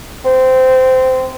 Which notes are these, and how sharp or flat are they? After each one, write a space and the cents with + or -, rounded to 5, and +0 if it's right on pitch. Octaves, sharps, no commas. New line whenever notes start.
C4 -15